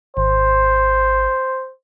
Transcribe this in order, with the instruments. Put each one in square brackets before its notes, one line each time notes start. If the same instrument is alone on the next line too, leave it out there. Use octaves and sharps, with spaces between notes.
[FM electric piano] G#1 [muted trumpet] C5